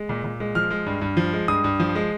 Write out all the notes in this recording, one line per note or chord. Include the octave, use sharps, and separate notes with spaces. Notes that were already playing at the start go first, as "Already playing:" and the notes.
Already playing: G#3
A#2
A#2
G#3
F3 F6
G#3
G2
G2
F3
G#3
G2 D#6
G2
F3
G#3